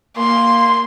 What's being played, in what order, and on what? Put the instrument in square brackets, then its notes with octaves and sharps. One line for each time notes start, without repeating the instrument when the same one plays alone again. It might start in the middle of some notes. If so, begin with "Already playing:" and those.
[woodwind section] A#3 [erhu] C6